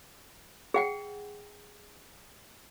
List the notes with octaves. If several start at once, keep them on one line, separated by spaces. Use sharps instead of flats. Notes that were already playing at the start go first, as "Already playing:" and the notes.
G#4 F#5 G5